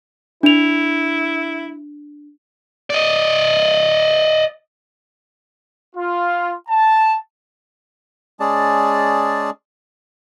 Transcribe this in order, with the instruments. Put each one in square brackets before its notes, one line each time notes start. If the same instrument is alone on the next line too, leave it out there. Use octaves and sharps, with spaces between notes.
[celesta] D4 F7 [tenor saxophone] E4
[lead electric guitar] D5 D#5
[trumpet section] F4
A5
[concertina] G#3 C#4 G#4 D5 A5